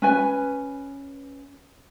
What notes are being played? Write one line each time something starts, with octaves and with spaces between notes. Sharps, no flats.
C#4 B4 G#5